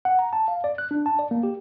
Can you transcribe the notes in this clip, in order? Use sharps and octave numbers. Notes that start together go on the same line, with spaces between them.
F#5
A#5
A5
F5
D5
F#6
D4
A5
D5
A#3
G4